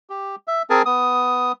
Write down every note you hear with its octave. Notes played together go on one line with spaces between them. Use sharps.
G4
E5
C4 G#4 A#4 G#5 A5
B3 D#6